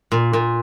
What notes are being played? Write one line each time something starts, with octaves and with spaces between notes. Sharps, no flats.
A#2
A#2